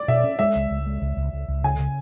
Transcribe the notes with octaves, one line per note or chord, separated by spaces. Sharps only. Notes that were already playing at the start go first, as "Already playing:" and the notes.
Already playing: D5
B2 E5
C#4
G#3 E5
C#2
C#2
G#3
C#2
C#2
C#2
C#2
C#3 G#5
C#3